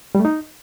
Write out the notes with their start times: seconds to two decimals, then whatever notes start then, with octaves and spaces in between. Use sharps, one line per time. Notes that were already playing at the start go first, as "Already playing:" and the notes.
0.15 G3
0.20 A3
0.25 D#4